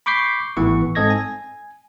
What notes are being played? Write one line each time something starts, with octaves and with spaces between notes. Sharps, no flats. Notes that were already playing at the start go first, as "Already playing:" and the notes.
B5 C#6 D6 G6 B6 C7
G#1 A2 E3 B3 C#6
G#2 C4 A4 D#5 G#6 A#6
G#5